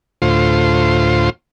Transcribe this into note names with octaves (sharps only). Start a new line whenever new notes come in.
D2 A2 F4 C5